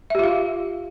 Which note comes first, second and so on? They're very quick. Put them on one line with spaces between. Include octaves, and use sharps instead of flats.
E5 G4 F4 F5